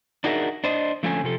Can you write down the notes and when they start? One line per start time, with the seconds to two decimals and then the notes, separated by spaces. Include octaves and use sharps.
0.24 D4 D#4 F#4 G#4 A#4 E5
0.64 D4 C5 D#5
1.03 D3 F3 A3 C4 C#4 G#5
1.24 C3 F3 A4